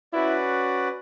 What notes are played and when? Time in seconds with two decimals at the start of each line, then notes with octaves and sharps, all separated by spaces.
0.13 C#4 E4 F#4 B4 D5